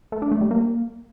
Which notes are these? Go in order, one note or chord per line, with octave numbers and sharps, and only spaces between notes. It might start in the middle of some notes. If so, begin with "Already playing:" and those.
A3
D4
A3
G3
A#3